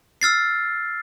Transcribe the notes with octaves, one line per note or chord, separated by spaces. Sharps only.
E6 F6 A6 C7